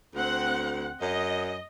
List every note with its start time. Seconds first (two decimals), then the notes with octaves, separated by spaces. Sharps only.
0.15 D2 C4 F#5
1.02 F#2 D#5